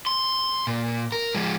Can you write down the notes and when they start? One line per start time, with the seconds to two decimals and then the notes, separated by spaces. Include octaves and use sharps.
0.07 C6
0.67 A#2
1.12 A#4
1.35 F3 G#3